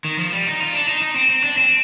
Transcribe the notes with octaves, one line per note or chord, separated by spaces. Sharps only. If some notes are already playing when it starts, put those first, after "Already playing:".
D#3
F3
G3
D#4
F4
D4
D#4
D#4
C4
C4
D4
C4